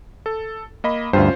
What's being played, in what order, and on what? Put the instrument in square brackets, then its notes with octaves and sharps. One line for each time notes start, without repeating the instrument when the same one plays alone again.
[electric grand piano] A4
A#3 D#5 B5
[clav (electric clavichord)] D2 G2 [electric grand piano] C#4 F4 C5